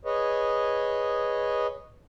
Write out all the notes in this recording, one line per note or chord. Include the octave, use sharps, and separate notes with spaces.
G#4 B4 C#5 D#5